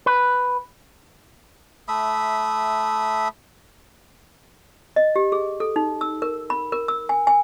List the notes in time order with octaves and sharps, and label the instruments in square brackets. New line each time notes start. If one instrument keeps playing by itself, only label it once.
[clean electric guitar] B4
[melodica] A3 E5 B5 D#6
[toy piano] D#5
G4
G#4
A4
D#4
E6
A#4
B5
A#4
E6
G#5
G#5